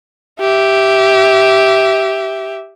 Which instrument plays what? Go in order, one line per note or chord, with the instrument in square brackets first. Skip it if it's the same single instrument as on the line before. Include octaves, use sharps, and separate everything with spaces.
[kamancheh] G4 E5